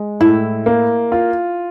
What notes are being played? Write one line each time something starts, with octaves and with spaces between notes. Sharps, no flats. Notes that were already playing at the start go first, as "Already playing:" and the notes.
Already playing: G#3
A2 E4
A#3
F4